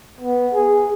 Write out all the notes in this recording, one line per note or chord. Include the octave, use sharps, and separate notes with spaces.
B3
G#4